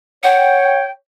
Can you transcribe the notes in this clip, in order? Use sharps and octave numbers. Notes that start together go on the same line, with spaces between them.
C#5 F#5 G5